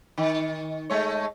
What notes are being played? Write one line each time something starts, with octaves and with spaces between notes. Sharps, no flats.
D#3
G#3 A3 C#5